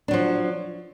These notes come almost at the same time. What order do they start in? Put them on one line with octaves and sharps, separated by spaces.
D4 F#3 F3